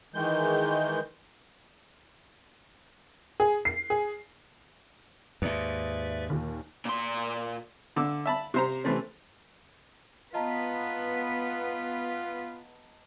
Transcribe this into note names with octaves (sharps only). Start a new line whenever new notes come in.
D#3 E3 G#3 G6
G#4
C7
G#4
D#2 G#2 B4 D5 E5
D#2 A#2
A#2 C6
D3 D6 E6
E5 A5 B5
C3 C5 A#5
C3 E3 A3 C4 C#4
B3 F4 B4 D#5 A5 A#5